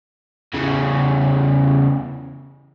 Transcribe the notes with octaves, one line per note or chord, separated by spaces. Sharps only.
E2 C#3